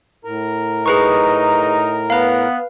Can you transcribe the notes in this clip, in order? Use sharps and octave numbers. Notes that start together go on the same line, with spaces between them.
A2 A#4 A#5
D#4 G#4 B4 C#6
B3 B4 F5